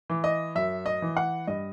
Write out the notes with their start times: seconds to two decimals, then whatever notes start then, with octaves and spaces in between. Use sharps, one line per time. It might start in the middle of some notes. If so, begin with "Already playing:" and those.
0.10 E3
0.24 D#5
0.55 F#2 E5
0.86 D#5
1.02 E3
1.17 F#5
1.47 G2 D#5